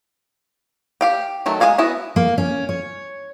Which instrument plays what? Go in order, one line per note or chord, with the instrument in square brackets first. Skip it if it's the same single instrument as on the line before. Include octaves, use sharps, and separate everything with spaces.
[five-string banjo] G4 F5 G5
D#3 F#3 A3
G#3 F#4 G#4 F5 G#5
B3 E4 F#4 D#5
[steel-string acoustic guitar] A#3
C#4
C#5